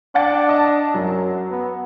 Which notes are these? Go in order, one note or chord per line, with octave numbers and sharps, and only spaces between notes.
D4 F#5 G5 A6
D#5 A5
F#2 F#3
B3